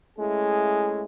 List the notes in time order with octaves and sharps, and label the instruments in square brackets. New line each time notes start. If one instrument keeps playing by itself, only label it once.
[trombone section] G#3 A3 C#4 E4 G#4